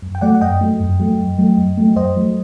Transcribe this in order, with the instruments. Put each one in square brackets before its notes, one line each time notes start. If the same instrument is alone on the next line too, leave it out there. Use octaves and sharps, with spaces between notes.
[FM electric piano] F#2
G5
F#3 A3 D5 F#5
F#5
F#2 D#5 G5
F#3 A3
F#2
F#3 A3
F#2
F#3 A3
F#2
F#3 A3
F#2 C5 D#5
F#3 A3